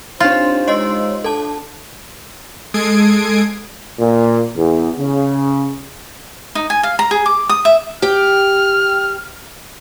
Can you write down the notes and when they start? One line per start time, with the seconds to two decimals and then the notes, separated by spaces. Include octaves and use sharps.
0.20 C4 D4 D#4 F4 G4 C5 C#5 C6
0.68 G#3 C#5 D#5 F5 C6 E6
1.24 D4 A4 A5
2.74 G#3 A4 D#6 G#6 C7 D7
3.99 A#2
4.56 E2
4.98 C#3
6.55 D#4
6.70 G#5
6.83 F5
6.99 A#5
7.11 G#4
7.26 D6
7.49 D#6
7.65 E5
8.02 G4 G5 F6